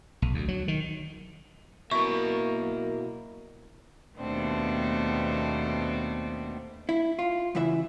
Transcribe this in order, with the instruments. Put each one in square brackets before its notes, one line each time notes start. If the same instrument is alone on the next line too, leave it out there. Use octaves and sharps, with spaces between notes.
[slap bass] B1
D2
F#3
D#3
[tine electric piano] B2 E4 [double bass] F#3 A#3 [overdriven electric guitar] A#4 E5 [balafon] C#6
[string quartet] D#2 B2 A3 B3 C4 D4
[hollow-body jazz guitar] E4
F4
F#2 C#3 E3 E4 E5